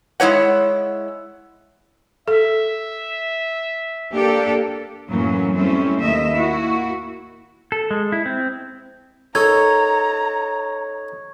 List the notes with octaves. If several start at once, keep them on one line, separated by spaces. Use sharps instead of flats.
G#3 E4 C#5 F#5
A4 E5
A#3 D4 G4 A4
F#2 A2 E3 F#3 A#3 C#4
G3 A3 C4 C#4 E4
D#2 A3 D#5 E5
A#3 E4 F#4
A4
G#3
E4
C4
D#4 A4 C#5 A#5 G#6